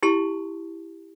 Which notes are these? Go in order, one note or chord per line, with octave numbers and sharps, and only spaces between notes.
E4 G4 A5 C6